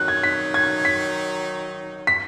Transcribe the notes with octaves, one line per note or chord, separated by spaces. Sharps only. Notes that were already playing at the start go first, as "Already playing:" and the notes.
Already playing: D#3 F#3 D#4 F#6
G#6
B6
G#6
B6
B6